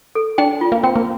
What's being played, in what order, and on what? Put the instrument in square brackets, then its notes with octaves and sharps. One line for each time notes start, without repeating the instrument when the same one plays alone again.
[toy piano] A4
[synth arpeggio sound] D4 [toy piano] G5
[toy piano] F4
[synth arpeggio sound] A#3
[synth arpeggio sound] C4 [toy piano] G5
[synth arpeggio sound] A#3